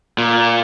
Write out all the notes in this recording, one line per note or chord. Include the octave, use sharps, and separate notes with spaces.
A#2